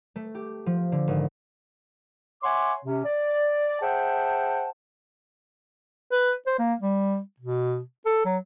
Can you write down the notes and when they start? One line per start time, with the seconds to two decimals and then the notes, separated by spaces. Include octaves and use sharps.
0.16 A3
0.35 G4
0.66 F3
0.92 D3
1.07 G#1
2.43 C#5 E5 F#5 G#5 C6 D6
2.85 C3 C#4
3.05 D5
3.82 G#4 C5 E5 F#5 G5 A5
6.12 B4
6.46 C5
6.59 A#3
6.80 G3
7.40 B2
8.06 A4
8.25 F#3